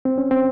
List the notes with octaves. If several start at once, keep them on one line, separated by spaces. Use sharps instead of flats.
C4
C#4
C4